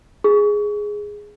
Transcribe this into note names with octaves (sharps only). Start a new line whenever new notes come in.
G#4